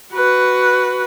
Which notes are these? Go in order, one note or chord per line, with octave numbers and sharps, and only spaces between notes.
F#4 B4